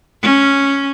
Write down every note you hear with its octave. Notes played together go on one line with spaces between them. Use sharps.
C#4